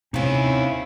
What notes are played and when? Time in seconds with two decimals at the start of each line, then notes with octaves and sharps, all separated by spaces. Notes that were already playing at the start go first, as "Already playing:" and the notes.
0.14 C3 C4 C#4 D#4 E4 F5